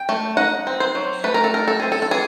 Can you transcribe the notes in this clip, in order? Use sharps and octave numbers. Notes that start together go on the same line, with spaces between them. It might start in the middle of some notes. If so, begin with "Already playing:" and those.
Already playing: G5
A3
D#4 F#5
C4
C5
F#3
A3 B4
A#4
A4
D#4 A#4
A4
C4 G#4
A4
A4
E3 G#4